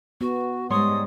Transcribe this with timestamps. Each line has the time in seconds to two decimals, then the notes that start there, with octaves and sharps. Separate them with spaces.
0.21 B3 F#4
0.70 G#2 G3 G#3 C#5 C6 D#6